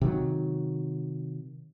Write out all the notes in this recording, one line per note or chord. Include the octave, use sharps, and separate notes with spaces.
C3 D#3 F#3